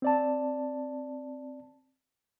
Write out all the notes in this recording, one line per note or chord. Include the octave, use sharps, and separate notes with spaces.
C4 D5 A5